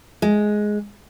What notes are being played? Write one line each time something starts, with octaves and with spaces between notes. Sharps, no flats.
G#3